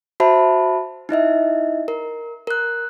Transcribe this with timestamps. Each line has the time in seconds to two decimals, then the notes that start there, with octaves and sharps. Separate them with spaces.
0.20 F#4 C5 E5 A5 B5
1.09 D#4 E4 D#5 E5
1.88 A#4
2.47 A#4 F#6